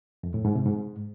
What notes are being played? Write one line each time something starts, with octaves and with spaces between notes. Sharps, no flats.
F2
A2
G#2
C3
G#2